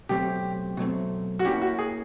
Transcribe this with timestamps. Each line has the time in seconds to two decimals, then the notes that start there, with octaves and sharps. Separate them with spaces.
0.09 B2 F#3 A3 C4 G4
0.77 B2 F#3 A3 C4
1.39 F#4
1.45 A#3 C#4 E4 G4
1.62 F#4
1.79 G#4